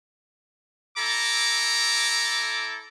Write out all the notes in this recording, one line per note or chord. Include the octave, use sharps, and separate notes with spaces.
E4 A4 A#5 D6